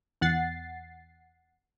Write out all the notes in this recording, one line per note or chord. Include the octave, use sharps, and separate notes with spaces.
E2 F#5 A6 C7